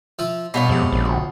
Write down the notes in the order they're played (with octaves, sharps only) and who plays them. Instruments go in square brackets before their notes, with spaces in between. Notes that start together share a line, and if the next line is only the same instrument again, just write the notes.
[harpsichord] F3 F4 E5
[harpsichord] G2 D#4 [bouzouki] B2 F4 C#5
[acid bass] F2 [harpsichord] G#2 C3
[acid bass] A#1
[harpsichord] D2